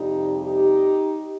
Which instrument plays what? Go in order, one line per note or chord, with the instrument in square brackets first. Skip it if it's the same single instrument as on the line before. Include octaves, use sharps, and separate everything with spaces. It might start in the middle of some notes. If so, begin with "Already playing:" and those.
Already playing: [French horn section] F2 C3 G3 D#4 G4
D#4 G4